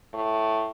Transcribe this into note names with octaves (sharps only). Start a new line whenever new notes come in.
A2